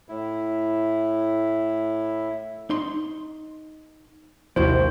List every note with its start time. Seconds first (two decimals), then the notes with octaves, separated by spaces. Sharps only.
0.09 A2 E4
2.70 D#4 C6
4.56 A#1 D#2 C3 F3 E4 F#4 C5